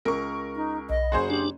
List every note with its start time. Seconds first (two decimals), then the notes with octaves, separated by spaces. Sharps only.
0.05 C#2 A#4 C#6
0.56 D#4
0.90 B1 D#5
1.12 F#1 F#4 G#4 C5 C6
1.30 D4 G4